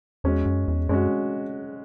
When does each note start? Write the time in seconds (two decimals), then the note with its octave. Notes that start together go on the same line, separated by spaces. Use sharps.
0.24 E2 G#3 C#4 F#4
0.46 F#2
0.68 E2
0.89 F#2 G#3 C#4 F#4